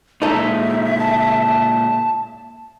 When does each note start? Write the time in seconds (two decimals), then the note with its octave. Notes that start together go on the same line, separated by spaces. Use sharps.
0.22 A#2 G#3 D#4 A4 E5
0.99 A5